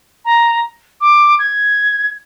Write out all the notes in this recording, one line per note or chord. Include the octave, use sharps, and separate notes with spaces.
A#5
D6
G#6